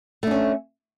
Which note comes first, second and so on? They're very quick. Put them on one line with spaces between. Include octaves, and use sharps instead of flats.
A3 D4 C#4